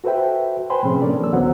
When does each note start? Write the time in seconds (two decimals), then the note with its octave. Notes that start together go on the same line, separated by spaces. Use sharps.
0.04 F#4 A4 B4 C5 E5 G5
0.70 B4 C5 G5 G#5 B5 C6
0.83 A2 C3 F3 C4 C#4 G#4
1.02 A#3 C#4 D4 A4 A#4 D5
1.19 E3 F#3 E6
1.32 C#2 D3 F#3 B3 C5 F#5